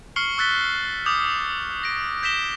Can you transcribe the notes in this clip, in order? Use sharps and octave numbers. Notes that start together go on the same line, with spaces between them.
C#6 F6 C7 C#7 F#7 G7
C#6 E6 F#6 A6 B6 G7
D6 D#6 G6
A#6 D7
G6 A#6 B6 E7 G7